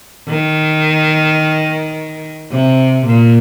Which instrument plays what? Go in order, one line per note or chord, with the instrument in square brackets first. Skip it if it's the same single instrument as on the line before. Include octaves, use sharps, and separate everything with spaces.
[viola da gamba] D#3
C3
A#2